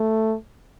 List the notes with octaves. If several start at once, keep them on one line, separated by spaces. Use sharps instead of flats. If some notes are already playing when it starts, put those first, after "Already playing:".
Already playing: A3